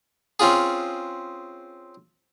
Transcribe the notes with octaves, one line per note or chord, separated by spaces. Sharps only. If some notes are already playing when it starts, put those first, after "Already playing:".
C4 C#4 F4 G#4